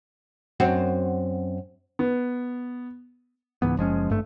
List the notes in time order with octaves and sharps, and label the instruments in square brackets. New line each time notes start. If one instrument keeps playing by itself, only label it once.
[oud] F#2 C4 F#4
[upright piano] B3
[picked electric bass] C#2 G#2 E3 B3
F#1 F3 G#3 C#4
G#1 G2 A3